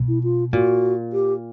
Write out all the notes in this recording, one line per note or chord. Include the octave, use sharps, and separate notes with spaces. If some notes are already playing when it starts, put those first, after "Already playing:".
Already playing: B2
E4
F4
A#2 F#4
G4